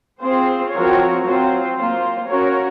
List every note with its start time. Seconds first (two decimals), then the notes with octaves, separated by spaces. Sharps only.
0.21 C4 F4 G#4 C5
0.73 F3 C4 F#4 A#4 C#5
1.24 F#3 C4 F4 C5
1.77 A#3 F4 C5
2.28 C#4 F#4 A#4 C#5